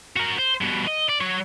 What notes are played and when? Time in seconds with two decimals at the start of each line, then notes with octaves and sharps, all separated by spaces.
0.16 F#4 A#4
0.39 C5
0.61 G2 B2
0.87 D#5
1.09 D5
1.21 F#3 C#5